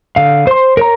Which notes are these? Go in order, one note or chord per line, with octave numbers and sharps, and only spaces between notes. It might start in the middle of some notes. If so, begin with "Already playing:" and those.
D3 F5
C5 C6
A#4 C#5 A#5